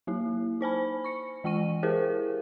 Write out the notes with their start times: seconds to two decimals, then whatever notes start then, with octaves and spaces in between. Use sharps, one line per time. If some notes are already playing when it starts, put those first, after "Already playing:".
0.07 F#3 A#3 E4
0.61 D#4 C5 G#5 B5
1.04 C#6 C#7
1.44 E3 G#3 G#5 C#6 D#7
1.83 E4 G4 G#4 A#4 C5 F5